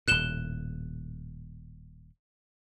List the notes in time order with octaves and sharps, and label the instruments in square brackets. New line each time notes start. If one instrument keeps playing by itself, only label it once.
[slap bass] D#1 A2 [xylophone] F#6 E7 G7